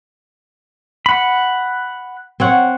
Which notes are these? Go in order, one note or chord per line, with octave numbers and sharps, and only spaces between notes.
F#5 B5
C4 C#5 F#5